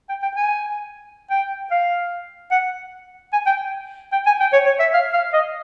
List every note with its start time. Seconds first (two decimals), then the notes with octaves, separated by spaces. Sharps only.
0.09 G5
0.23 G5
0.37 G#5
1.30 G5
1.71 F5
2.51 F#5
3.33 G#5
3.46 G5
4.12 G5
4.26 G#5
4.40 G5
4.53 C#5
4.66 C#5
4.80 E5
4.94 F5
5.13 F5
5.33 D#5